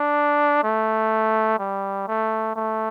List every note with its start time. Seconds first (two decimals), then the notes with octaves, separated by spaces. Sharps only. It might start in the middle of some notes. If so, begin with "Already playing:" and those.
Already playing: D4
0.64 A3
1.59 G3
2.08 A3
2.56 A3